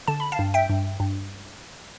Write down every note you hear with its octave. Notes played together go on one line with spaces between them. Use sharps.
D3 A5
B5
F5 A5
G2
E5 G5
G2
G2